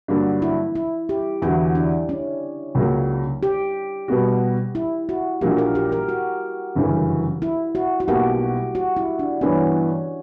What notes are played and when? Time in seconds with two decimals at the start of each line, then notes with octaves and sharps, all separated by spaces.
0.08 G2 D3 F#3 A#3 D4
0.42 E4
0.75 E4
1.09 G4
1.42 E2 D3 F#3 E4
1.75 D4
2.09 C#4
2.75 C#2 C#3 F#3 A#3
3.43 G4
4.08 B2 G3 B3 F#4
4.75 E4
5.09 F#4
5.41 A#1 A#2 F#3 A#3 G4
5.58 A#4
5.75 G4
5.92 A#4
6.09 F#4
6.75 G1 F#2 C#3 E3
7.42 E4
7.75 F#4
8.00 F#4
8.08 B1 B2 A#3 G4
8.75 F#4
8.97 E4
9.19 D4
9.41 G2 E3 B3 C#4